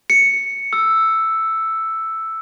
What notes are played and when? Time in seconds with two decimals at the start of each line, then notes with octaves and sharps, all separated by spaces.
0.10 C#7
0.73 E6